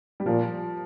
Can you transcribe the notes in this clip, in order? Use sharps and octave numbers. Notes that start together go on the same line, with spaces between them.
G3
A#2 F3